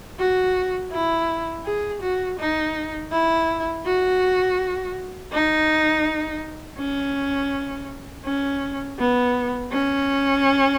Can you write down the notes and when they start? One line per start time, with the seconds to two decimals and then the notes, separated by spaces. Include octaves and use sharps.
0.19 F#4
0.92 E4
1.65 G#4
2.02 F#4
2.39 D#4
3.12 E4
3.86 F#4
5.32 D#4
6.78 C#4
8.25 C#4
8.99 B3
9.72 C#4